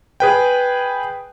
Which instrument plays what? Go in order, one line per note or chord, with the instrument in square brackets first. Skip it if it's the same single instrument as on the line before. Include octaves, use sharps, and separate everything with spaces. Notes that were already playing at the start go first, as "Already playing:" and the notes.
[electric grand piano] G#4 B4 G5